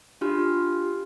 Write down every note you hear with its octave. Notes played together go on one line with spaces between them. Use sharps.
D4 F4 G4 C6 F6